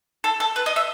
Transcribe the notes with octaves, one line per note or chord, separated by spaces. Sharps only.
A4
A4
B4
D#5
E5